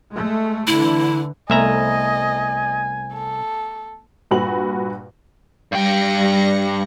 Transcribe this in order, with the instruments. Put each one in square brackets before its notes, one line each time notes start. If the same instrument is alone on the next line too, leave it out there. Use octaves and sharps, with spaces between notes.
[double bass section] G#3 A3
[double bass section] D3 E3 [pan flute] E4
[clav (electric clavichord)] C2 E5 A#5 [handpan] A3 B3 [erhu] D#5 [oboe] G#5
[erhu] A4
[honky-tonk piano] G2 A#2 F#4 B4 F#7
[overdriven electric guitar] G2 G5 [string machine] G3 A#6 C#7